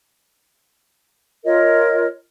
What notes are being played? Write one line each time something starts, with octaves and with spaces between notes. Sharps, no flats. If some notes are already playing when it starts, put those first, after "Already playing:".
F4 A#4 C#5 D#5